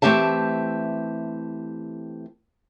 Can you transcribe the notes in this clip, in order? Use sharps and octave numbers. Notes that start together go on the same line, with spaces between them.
E3 A3 C4 G4 E5 A5